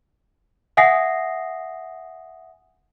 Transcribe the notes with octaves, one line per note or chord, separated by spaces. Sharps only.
E5 F#5 G#5 D#6 A#6 C7